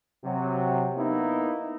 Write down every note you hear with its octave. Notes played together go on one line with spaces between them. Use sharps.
C3 F#3
A#3 B3 D#4 E4